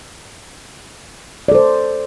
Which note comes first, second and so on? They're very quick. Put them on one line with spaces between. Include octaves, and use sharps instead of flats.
D5 A4 C5